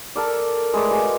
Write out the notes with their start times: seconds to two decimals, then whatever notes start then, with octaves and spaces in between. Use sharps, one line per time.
0.16 A4 A#4 D5
0.73 G#3 A3 B4 D5
0.91 G#3 F#4